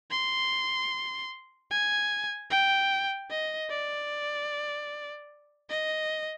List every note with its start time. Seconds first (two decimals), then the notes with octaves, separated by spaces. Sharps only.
0.11 C6
1.71 G#5
2.51 G5
3.30 D#5
3.70 D5
5.70 D#5